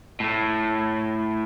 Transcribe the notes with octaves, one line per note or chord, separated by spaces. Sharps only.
A2 A3